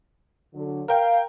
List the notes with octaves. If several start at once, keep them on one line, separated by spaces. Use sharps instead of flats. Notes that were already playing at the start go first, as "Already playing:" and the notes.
D3 F#3
A#4 F5 G5